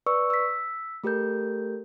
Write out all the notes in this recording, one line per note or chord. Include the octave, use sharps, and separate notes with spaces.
B4 D5 C#6 E6
E6 B6
A3 G4 A4 A#4 G6